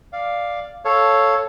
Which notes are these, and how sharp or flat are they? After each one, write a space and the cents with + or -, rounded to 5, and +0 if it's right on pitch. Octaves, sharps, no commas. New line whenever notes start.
D5 +0 F5 +0
A4 +0 C#5 +0 F5 +0